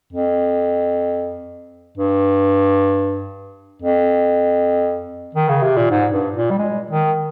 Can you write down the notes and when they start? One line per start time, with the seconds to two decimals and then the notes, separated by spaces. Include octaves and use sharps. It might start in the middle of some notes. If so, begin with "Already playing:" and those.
0.13 F2
1.97 G2
3.82 F2
5.35 D#3
5.49 C#3
5.63 C3
5.77 A#2
5.90 G#2
6.12 G2
6.36 A#2
6.51 G3
6.59 G#3
6.90 D#3